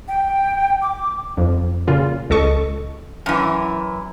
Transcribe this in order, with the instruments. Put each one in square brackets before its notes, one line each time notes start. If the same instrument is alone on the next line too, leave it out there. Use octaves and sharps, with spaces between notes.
[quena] G5
D6
[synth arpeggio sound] F2
A#2 C#3 F4
C#2 A4 D#5 C#6
[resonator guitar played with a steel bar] F#2 E3